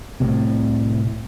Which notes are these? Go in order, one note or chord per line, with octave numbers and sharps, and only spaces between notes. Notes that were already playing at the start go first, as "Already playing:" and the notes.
C2 A2 C3